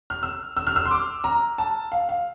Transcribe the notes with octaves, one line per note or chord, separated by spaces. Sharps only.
F6
E6
E6
F6
E6
C6
D6
A#5
A5
F5
F5